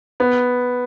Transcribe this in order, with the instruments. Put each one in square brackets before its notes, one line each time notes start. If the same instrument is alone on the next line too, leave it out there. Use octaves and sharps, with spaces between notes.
[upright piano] B3